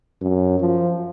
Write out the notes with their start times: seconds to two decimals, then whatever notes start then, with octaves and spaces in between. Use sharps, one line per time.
0.21 F#2
0.60 F3